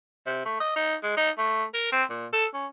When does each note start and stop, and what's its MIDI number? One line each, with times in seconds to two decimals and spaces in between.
0.27 0.43 48
0.45 0.58 57
0.60 0.76 75
0.76 0.95 63
1.03 1.12 56
1.17 1.30 63
1.38 1.64 57
1.74 1.88 70
1.92 2.03 60
2.10 2.27 46
2.33 2.46 69
2.54 2.66 61